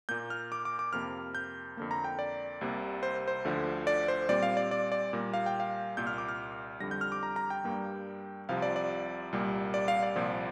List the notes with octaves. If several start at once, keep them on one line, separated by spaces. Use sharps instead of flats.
A#2 A#3 G6
F6
D6
D6
D6
F2 C3 A#3 F6
G6
F2 D3 A#3
A#5
G5
D5
C2 C3 A#3
C5
C5
D2 D3 F3
D5
C5
A#2 G3 C4 D5
F5
D5
D5
D5
A#2 G3 A#3
F5
G5
F5
C2 A#2 A#3 G6
F6
D6
F6
F2 D3 G3 A#6
G6
F6
D6
A#5
A#5
G5
G2 G3 A#3
C2 C3 F3 F5
D5
D5
C2 A#2 G3 A#3
D5
F5
D5
C2 A#2 F3